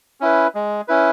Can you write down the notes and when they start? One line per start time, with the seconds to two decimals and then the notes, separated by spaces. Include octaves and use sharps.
0.20 C#4 E4 B4
0.55 G#3
0.88 C#4 E4 B4